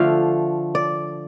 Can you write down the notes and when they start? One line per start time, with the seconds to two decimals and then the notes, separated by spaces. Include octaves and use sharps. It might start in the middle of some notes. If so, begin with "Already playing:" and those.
Already playing: D3 F3 A3 F5
0.75 D5